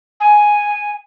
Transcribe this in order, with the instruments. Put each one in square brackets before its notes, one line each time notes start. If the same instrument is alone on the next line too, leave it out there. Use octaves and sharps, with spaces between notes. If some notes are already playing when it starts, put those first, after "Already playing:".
[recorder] G#5